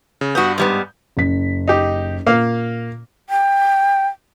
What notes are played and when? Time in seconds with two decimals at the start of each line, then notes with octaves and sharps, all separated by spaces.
0.21 C#3
0.35 G2 B3 F#4 D#6 G6
0.58 G#2 G3 B3
1.17 F#1 B6
1.67 D#4 G4
2.27 A#2 A#3 F5
3.30 G5